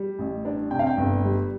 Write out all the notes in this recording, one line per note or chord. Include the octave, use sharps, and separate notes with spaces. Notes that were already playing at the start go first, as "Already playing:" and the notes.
Already playing: G3
A1
D4
C3 G5
F5
G5
G1
G3